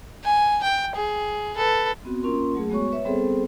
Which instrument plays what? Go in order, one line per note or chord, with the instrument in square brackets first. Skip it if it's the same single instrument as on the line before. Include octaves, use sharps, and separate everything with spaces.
[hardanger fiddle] G#5
G5
G#4
A4 B4
[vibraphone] B3 C4 F#4
A#3 C#4 F4 A#4 C6
F#3 A3 G#4
G#3 B3 F#4 C#5 C#6
B4 C#5 E5
G3 B3 C4 G#4 A4 C5